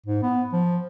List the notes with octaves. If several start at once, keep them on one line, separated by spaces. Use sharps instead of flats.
G#2
B3
F3